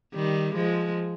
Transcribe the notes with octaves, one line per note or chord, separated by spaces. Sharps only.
D#3 G3
F3 G#3